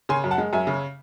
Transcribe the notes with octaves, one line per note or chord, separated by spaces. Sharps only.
C#3 G#5 C6
F#2
F#5 A5
G#3
F#2 E5 G#5
C#3